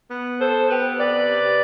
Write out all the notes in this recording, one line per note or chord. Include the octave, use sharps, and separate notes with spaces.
B3
A4 C5
B3
G4 B4
C3 B4 D5
C3